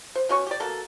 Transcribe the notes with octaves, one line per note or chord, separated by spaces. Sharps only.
C5
B2 C#4 C#6
G4 D5
B2 A#3 A4